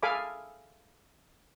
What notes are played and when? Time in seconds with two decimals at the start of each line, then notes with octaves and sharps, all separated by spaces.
0.03 G#4 A4 F5 G#5 B5 D6